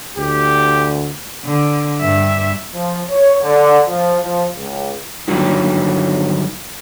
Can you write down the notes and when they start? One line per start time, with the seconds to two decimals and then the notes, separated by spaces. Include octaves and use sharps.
0.18 D2 G4
1.45 D3
2.00 G2 E5
2.74 F3
3.09 C#5
3.42 D3
3.87 F3
4.22 F3
4.55 C#2
5.28 G2 D3 D#3 F#3 G3